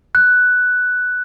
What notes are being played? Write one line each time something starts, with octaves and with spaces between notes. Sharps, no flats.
F#6